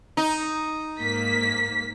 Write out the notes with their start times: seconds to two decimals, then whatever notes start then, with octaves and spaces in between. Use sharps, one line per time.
0.17 D#4
1.00 G#2 A#3 B6